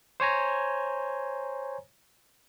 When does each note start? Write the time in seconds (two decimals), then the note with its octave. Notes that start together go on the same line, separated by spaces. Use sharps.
0.20 C5 C#5 G#5 A#5